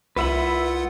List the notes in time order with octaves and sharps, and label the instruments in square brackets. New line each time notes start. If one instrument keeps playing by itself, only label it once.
[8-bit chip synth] C2 F4 F#5 [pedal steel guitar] B4 E5 B5